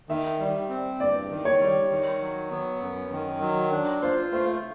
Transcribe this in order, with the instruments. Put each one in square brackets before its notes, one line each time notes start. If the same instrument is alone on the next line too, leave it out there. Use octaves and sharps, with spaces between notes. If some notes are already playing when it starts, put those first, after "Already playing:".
[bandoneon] D#3 [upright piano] E5
[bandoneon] G3
C4
[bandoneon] G2 [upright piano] D5
[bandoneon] D#3
[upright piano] C#5
[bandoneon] G3
D#3
F#3
B3
F#2
D#3
F#3
D4
[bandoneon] F4 [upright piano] C5
[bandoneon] A3 [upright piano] C5